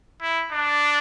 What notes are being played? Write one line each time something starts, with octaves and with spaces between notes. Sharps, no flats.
E4
D4